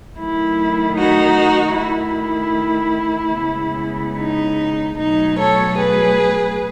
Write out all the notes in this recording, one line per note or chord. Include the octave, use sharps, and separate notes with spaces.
D#3 F#3 A3 E4
D#4 F#4
D#3 A3 E4
C#3 G#3 B3
D#4
B2 F#3 A3 D#4
A4 C#5
G#4 B4